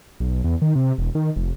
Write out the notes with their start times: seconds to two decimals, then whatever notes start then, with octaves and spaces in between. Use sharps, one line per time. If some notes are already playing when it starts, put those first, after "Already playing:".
0.20 B1
0.44 E2
0.62 D#3
0.75 C3
0.98 E1
1.15 D#3
1.36 F1